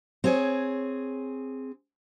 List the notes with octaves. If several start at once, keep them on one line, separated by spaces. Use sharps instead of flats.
C4 G#4 C#5